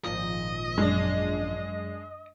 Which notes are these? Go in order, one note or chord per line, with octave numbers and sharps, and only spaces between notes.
G#1 A#2 F3 D#5
F#2 G#3 D4